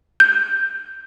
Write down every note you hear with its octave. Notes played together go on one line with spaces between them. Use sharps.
G6